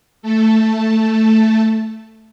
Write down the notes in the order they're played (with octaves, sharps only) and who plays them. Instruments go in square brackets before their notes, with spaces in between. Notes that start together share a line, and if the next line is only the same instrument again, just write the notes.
[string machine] A3 A4